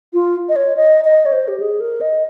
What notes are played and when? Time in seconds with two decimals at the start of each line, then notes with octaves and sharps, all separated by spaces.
0.13 F4
0.49 D#5
0.56 C#5
0.77 D#5
1.04 D#5
1.26 C#5
1.32 C5
1.48 G4
1.60 G#4
1.80 A#4
2.01 D#5